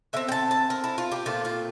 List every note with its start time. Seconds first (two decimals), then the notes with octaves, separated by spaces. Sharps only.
0.13 D3 F3 C4 E5
0.28 G5
0.32 A5
0.51 A5
0.70 A#4
0.84 E4
0.98 F4
1.12 G4
1.26 A#2 A3 C4 F4
1.45 F4